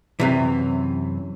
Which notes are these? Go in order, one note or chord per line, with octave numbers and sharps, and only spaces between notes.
F#2 C3 E3